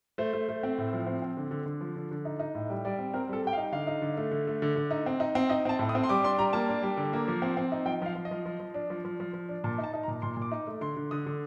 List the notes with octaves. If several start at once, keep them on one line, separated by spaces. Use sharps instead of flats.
A3 C5
A3
A3
C4
A2
F3
C4
C4
D3
D3
D3
F3
D3
D3
D#4
D#4
A2
G3
G3 D5
C4
C4 A#4
G3 A4
G3 G5
F5
D#4
D3 F5
D#4
D3
A3
D3
A3
D3
D3
D#4
C4
D#4
C4
D#4 D#5
C4 A5
A2
D#6
C4
C6
G3 D6
D4 C6
G3 A#5
A#3 A5
D4
G3
D3
A#3
F3
C4
C4
D#4
F3 G5
F3 F5
F3
D#5
F3
F3
F3
D4
F3
F3
F3
F3
D4
A#2 A5
D#4
A5
D#4
A#5
A#2
A#2 C6
A#2 D6
D#4
A3
D3 C6
D3
D3 D#6
D3